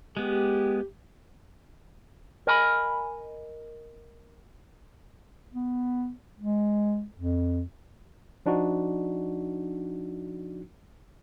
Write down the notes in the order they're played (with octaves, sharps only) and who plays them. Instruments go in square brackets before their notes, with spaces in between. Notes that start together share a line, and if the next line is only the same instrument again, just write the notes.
[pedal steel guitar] G#3 B3 [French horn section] G4
[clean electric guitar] A#4 D#5 G#5 A#5 B5
[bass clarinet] B3
G#3
F2
[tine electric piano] F3 D4 D#4 F#4